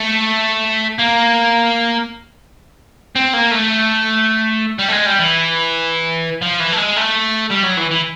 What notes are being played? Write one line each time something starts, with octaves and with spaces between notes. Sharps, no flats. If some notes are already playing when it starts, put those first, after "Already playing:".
Already playing: A3
A#3
C4
A#3
A3
G3
A3
G#3
G3
E3
F3
E3
A3
G#3
A3
G3
F#3
E3
E3